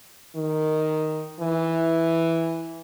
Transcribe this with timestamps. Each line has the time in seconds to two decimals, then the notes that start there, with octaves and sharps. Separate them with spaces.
0.36 D#3
1.40 E3